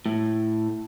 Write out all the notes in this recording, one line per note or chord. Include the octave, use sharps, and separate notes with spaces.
A2